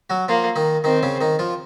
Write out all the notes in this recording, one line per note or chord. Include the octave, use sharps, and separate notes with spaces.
F#3 F#4
F3 A#3 F4
D#3 D#4
D#3 C4 D#4
C#3 C#4
D#3 D#4
F3 F4